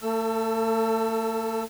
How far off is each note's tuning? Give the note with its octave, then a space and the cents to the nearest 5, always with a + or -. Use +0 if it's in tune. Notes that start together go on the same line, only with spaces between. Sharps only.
A3 +40 A4 +0 E6 +20